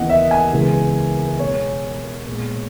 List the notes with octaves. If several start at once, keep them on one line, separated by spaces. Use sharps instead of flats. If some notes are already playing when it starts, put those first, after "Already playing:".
Already playing: D#2 C#3 E3 B3 D#5 F#5
E5
G#5
C#2 C#3 E3 G#3 B3
B2 G#3 B3 C#5
A#2 G#3 B3